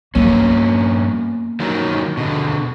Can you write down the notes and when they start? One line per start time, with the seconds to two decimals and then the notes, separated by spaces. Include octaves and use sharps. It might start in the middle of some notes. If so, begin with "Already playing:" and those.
0.15 G2 A#3 B3 C#4
1.60 D#3 F#3
2.17 B2 D3